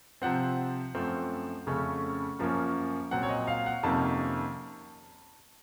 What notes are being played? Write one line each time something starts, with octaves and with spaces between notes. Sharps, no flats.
C3 F3 C4 F#5
F#2 F3 A3 C4
F2 C#3 A3 C#4
F#2 F3 A#3 C#4
A#2 F#3 C4 F#5
C#5
D#5
F5
F#5
F2 C3 D#3 A#3 C#4 A5